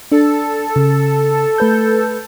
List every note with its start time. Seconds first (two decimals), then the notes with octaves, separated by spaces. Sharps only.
0.12 D4 A4
0.76 C#3
1.58 A3 B4 G6